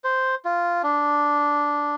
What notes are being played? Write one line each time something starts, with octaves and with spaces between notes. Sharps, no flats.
C5
F4
D4